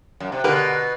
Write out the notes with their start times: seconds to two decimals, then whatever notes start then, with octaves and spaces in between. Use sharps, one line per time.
0.20 F#2
0.32 C3
0.44 B2 D3 G4 A#4 B4